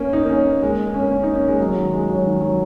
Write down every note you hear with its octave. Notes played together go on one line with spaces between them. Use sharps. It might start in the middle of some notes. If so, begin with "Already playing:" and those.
Already playing: A#3 C#4
D#4
A#3
C#4
A#3
G#3
A#3
C#4
A#3
C#4
D#4
C#4
G#3
F#3
D#3
G#3
F#3
D#3
F#3